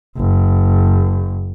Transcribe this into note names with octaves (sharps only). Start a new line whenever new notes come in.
F#1